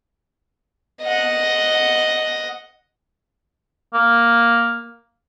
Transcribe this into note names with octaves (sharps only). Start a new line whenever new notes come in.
D#5 F#5
A#3